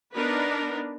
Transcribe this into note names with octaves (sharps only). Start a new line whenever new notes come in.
B3 D4 D#4 A#4 B4